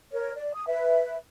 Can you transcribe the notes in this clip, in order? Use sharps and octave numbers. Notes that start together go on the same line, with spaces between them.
A#4 C#5
D5
D#6
B4 E5